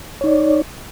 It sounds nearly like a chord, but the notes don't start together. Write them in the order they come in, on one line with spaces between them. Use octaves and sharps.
C#5 D#4 D5